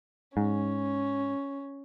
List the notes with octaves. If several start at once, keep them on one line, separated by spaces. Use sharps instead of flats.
G#2 C#4